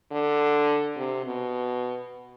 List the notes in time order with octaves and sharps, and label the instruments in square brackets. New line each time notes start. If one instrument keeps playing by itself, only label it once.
[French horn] D3
C3
B2